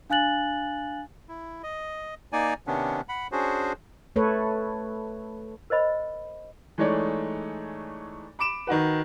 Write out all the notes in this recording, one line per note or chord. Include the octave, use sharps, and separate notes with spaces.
D4 F5 G#5 F#6 A6 F#7
E4
D#5
A#3 D#4 D5 G#5
C3 D#3 B3 C#4 D4
F#5 B5
C#4 D4 F#4 G#4 C5
A3 A4 B4 C#5
A#4 C5 D#5 B5
E3 G#3 A3 D#4 C#5 D5
B5 D6 D7 E7
D#3 D#4 F#4 B4